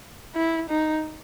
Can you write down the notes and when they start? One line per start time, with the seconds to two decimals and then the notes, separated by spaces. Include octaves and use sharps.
0.36 E4
0.69 D#4